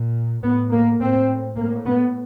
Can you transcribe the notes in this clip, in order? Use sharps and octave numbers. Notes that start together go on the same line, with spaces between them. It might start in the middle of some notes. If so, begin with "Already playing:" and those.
Already playing: A#2
A2 B3
A#3
A2 C4
A2 A#3
B3